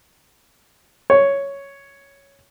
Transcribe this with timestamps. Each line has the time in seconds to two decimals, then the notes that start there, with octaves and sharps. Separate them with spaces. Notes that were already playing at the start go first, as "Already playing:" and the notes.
1.10 C#5